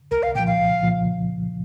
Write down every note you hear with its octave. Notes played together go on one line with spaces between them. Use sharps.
C2 A#4
F5
A#2 F3 G5
F5
C2
A#2 F3